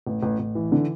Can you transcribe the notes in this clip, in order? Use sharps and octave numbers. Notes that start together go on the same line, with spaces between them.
A1
A1
A1
E3
D3